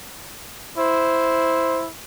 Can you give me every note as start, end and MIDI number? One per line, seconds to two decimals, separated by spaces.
0.78 1.89 64
0.78 1.82 72